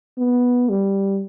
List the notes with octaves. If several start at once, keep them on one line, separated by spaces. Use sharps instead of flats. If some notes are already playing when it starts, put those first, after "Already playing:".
B3
G3